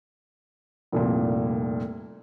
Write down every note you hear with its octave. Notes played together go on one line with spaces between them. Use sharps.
F1 C2 A#2